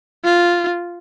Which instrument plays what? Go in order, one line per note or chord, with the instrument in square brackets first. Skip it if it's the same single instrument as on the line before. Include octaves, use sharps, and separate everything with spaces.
[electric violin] F4